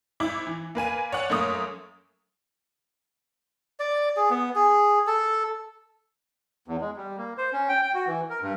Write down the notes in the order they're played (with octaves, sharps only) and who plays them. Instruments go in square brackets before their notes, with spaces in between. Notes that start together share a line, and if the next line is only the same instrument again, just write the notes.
[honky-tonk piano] G#1 E4 D6
E3
A#3 B4 G#5 D#7
C#5 D5 F#5
F#2 A3 A#3 C#5 D#6
[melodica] D5
G#4
B3
G#4
A4
[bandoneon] E2
G#3
G3
A#3
C5
C#4
G5
G5
F#4
E3
A#4
G2